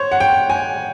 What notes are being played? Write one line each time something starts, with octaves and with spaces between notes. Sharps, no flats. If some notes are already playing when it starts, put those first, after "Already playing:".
Already playing: C5 C#5
F#5
G5
G#5